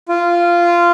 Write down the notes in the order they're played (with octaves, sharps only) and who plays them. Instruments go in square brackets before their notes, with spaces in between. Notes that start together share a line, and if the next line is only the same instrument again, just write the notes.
[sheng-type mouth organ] F4